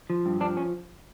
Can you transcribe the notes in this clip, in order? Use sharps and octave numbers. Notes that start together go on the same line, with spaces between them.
F3
G2
F3 D4
C#4